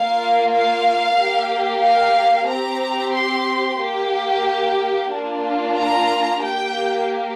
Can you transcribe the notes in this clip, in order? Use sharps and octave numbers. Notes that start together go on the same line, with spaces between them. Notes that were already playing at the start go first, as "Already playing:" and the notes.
Already playing: A#3 F4 F5
F5
A#3 G4
F5
C4 G4 A#5
C6
A#3 G4
A#3 D4 F4
A#5
A#3 G4 G5